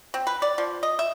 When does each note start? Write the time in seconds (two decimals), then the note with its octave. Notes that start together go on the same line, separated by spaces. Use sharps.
0.14 C4
0.27 B4
0.42 D5
0.58 F3
0.83 D#5
0.99 E5